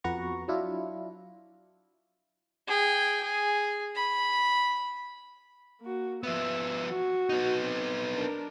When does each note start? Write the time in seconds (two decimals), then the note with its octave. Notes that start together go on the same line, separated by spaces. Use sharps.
0.04 F2 B3 F#4 B4 A#5 C#6
0.48 F#3 D4 E4 F4
2.67 G#4 G5
3.23 G#4
3.95 B5
5.81 A#3 F#4
6.23 F3 B3 E5
6.89 F#4
7.29 B3 D#4
7.64 C4
8.15 D4 A#4